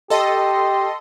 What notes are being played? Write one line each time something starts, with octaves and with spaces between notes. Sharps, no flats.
G4 A4 D#5 C6